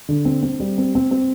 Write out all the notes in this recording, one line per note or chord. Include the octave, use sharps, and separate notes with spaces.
D3
C4
C4
G3
C4
C4
C4